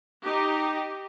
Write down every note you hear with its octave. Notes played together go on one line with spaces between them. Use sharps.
D#4 G4